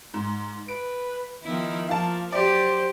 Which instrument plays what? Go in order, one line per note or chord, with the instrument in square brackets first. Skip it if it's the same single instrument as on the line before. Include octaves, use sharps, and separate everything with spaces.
[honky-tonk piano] G#2
[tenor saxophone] B4 [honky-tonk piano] D7
[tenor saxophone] D#3 [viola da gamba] F3 B3 E4
[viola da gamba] F3 [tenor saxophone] A#3 [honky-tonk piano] F5 A5
[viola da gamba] F#3 G4 [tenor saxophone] C5 [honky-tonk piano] D5